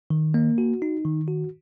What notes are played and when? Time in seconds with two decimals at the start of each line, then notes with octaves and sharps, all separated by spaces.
0.10 D#3
0.34 A#3
0.58 F#4
0.82 D#4
1.05 D#3
1.28 F#4